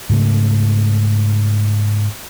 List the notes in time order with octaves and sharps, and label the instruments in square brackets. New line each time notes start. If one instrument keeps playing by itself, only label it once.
[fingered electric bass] G#2 C#3 G#3 A3